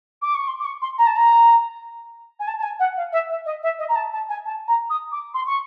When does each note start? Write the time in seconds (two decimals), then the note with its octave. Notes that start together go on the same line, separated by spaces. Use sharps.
0.22 D6
0.34 C#6
0.47 C6
0.59 D6
0.64 C#6
0.81 C6
0.98 A#5
1.06 A5
1.15 A#5
2.39 G#5
2.47 A5
2.58 A5
2.62 G#5
2.79 F#5
2.96 F5
3.12 E5
3.29 E5
3.45 D#5
3.63 E5
3.78 D#5
3.88 A#5
3.95 A5
4.12 A5
4.29 G#5
4.45 A5
4.67 A#5
4.89 D#6
5.11 D6
5.34 C6
5.47 C#6